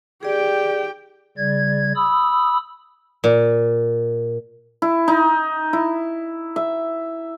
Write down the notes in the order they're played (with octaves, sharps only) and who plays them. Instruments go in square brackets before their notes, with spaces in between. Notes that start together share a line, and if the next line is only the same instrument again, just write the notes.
[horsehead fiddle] G4 G5 [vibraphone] G#4 D5
[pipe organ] C#3 G3 D5 G#6
B5 D#6 E6
[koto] A#2
[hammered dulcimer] E4
D#4
E4
E5